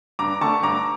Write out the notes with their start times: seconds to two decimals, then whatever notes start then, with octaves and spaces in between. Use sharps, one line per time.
0.19 G2 A#5 D6
0.41 D3 A3 A5 C#6
0.63 G2 A#5 D6